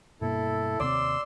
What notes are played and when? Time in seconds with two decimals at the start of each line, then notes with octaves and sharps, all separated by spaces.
0.21 G2 B2 A#3 E4 A4
0.80 D#2 C3 C4 D5 C6 E6